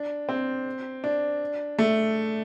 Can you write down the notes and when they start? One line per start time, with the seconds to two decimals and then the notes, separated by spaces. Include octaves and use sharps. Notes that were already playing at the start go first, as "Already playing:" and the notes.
Already playing: D4
0.29 C4
1.04 D4
1.79 A3